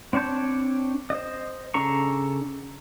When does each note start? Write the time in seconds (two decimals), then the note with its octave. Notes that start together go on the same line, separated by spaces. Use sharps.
0.13 C4 D4 C#5 A5 G6
1.10 C5 D#5
1.74 C#3 D4 A4 A#5 C#6